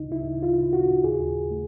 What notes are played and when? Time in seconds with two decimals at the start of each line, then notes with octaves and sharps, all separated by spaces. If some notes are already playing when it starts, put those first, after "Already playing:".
Already playing: D2 C#3 D#4
0.11 C#3 E4
0.43 F4
0.58 C#3
0.73 F#4
1.04 D#2 G#4
1.51 A3